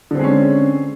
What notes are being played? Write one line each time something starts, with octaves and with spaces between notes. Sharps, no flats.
D3 G#3 C4 C#4